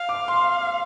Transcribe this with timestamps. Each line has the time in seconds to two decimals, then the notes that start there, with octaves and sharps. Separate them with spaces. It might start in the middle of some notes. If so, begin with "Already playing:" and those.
Already playing: F5
0.09 D6
0.28 C6